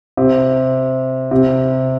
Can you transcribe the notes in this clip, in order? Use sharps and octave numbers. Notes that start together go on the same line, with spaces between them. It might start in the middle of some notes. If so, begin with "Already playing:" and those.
C3
C3